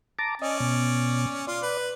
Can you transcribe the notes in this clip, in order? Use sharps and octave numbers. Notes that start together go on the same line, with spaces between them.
A5 A#5 D6
C#4 D5 D#5
B2
F4 D5
B4